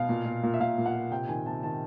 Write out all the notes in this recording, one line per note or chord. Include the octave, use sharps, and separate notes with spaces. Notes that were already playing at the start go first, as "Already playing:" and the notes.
Already playing: B2 F5
A#2
A#2
A#2
E5
A#2 F5
A#2
F#5
A#2
C3 G5
D#3 G#5
C3 A5
D#3 A5